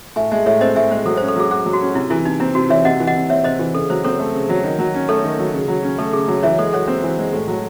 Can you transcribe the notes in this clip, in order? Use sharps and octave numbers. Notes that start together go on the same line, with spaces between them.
A2 E5 G#5
G#3 E5 G#5
A2 C#5 E5
C4 C5 D#5
A2 E5 G#5
G#3 C5
F#3 A4
C5
C#4
A4
F#3 G#4
F#4 G#4
F#3
F#4
C#4
C3 E4
E3 E4
C3 D#4
C4 E4
C3 F#4
E3 C#5 E5
C3 D#5 F#5
E3
D#5 F#5
C3
C4 C#5 E5
C3 C5 D#5
E3
C#3 A4
F#3 C5
C4 A4 C#5
A3
C#3
F#3
D#3
F#3
C#4
A3 A4 C#5
D#3
F#3
C#3
F#3
C#4
A3 A4
C#3 G#4
F#3
E3 C#5 E5
G#3 A4 C#5
F#4 A4 C#5
C4
E3
G#3
A2
F#3